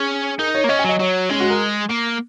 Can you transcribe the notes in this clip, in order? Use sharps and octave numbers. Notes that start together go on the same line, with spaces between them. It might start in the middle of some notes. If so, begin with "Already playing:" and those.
Already playing: C#4 G#4
D#4 A#4
C#5
A#3
C#4 D#5
G#5
F#3 D#5
F#3 C#5
G#3 C#4
F#4
A#4
A#3